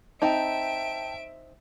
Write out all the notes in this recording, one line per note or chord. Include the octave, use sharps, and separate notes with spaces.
C4 D#4 E5 G5 A5 D7